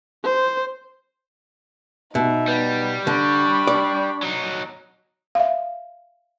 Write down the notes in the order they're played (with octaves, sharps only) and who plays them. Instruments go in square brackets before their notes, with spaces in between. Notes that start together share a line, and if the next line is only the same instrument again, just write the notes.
[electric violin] C5
[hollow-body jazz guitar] B2 [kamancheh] D#4 [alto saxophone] E5
[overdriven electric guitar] G3 [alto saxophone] B3
[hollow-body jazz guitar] D3 [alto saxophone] D4 [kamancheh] B5 C#6
[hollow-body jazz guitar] D5
[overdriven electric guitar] F#3 D#4
[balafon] E5 F5